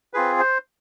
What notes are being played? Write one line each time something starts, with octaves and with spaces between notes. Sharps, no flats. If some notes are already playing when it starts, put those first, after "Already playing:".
C4 F4 G#4 B4
C5